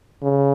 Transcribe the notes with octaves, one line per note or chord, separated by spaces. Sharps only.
C#3